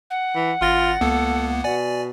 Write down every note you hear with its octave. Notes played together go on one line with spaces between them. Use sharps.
F#5
E3
G#1 F4 A6 A#6
C#2 A#3 B3 A4
B2 D5 G#5